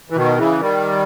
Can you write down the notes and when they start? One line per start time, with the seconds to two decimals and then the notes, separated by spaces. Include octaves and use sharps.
0.10 E3
0.15 B2 D#3
0.38 C#3 E3
0.60 D#3 G3